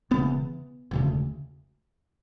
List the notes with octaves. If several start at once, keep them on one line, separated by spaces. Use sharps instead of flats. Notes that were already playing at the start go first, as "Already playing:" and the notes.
E1 E2 C#3 B3
E1 D2 C#3